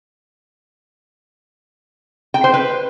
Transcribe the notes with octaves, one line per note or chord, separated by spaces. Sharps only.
G5
C5
B4